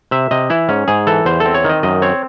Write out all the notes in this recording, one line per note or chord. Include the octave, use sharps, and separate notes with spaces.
C3 E5
C3 D#5
E3 E4
G#2 C#4
G#2 G#4
E3 A4
E2 C5
A4
C4
C#5
D#3 D#5
F#2 D#5
C4 C#5